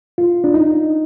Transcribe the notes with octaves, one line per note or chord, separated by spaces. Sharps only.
F4
D4
D#4